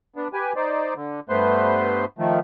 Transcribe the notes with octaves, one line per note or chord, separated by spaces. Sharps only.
B3 D4
G4 B4 G#5
D#4 C5 D5
D3
G2 A3 B3 B4 C5 C6
D#3 F3 A3